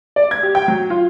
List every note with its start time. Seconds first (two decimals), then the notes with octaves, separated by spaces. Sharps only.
0.16 D5
0.31 G#6
0.43 G4
0.55 G5
0.68 F#3
0.90 F4